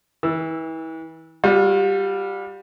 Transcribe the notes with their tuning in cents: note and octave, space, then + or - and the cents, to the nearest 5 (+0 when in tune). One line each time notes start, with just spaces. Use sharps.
E3 -30 E6 +10
G3 +0 F4 +45